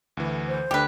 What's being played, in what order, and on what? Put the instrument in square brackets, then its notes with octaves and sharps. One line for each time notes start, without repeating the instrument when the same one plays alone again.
[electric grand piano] D2 E3
[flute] C5
[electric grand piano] D2 D3 D4 [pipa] G4 B4